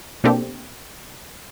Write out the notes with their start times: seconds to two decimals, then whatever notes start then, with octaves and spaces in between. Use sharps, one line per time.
0.24 B2 A#3 C4 D4 G4 A4